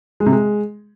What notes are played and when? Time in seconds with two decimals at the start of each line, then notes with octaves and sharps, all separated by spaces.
0.20 G#3
0.26 C3
0.32 G#3